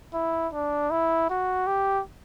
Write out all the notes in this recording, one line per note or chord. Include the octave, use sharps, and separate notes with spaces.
E4
D4
E4
F#4
G4